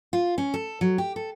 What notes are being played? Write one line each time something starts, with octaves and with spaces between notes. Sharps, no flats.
F4
C#4
A4
F#3
G4
A4